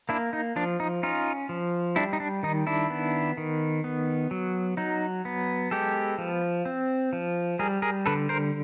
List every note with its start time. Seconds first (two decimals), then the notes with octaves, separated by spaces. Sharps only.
0.09 A#3 D4 E4
0.33 D#4
0.56 F3 D4
0.80 D#4
1.03 C#4 D#4 F4
1.49 F3
1.96 G3 D4 E4
2.13 D#4
2.20 D4
2.43 D#3 D#4
2.67 D4 E4
2.90 B3
3.37 D#3
3.84 B3
4.31 F#3
4.77 F#3 D#4
5.25 B3
5.71 G#3 G4 A4
6.18 F3
6.65 C4
7.13 F3
7.59 G3 G#4 A#4
7.82 G#4 A#4
8.06 D3 A4 B4
8.29 A#4 C5